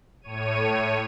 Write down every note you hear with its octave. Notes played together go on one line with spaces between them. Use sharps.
A2 C#5 D#7